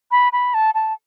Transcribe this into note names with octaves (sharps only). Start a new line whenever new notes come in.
B5
B5
A5
A5